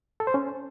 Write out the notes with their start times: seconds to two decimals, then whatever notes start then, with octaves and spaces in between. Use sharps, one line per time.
0.20 A4
0.27 C5
0.34 C#4